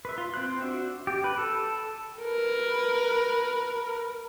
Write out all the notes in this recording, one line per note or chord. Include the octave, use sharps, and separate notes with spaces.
B4 E5
F4
C4 C5 F#6
D4 F#4 E5
G4
B4
A4
A#4 B4